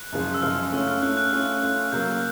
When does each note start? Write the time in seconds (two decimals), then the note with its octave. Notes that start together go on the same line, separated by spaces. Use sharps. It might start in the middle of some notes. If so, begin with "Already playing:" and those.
Already playing: F#6
0.12 F#2 C#3 F3 G#3
0.34 E6
0.42 F#2 C#3 F3 G#3 F6
0.72 A3 C#4 F4 E6
0.88 F6
1.02 A3 C#4 F4 F#6
1.17 F#6
1.32 A3 C#4 F4
1.62 A3 C#4 F4
1.92 C#3 F#3 A#3 G6
2.07 F6